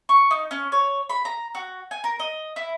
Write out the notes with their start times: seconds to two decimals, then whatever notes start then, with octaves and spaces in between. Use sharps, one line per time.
0.09 C#6
0.31 D#4
0.51 C#4
0.72 C#5
1.10 B5
1.25 A#5
1.55 F#4
1.91 G#5
2.04 A#4
2.19 D#5
2.56 E4